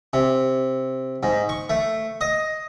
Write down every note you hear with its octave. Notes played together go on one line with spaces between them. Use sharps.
C3
G#2
C#6
A3
D#5